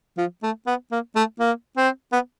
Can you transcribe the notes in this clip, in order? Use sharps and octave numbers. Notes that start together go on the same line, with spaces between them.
F3
A3
B3
A#3
A3
A#3
C4
B3